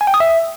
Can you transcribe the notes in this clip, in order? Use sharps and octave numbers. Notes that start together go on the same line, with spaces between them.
G#5
G5
D#6
E5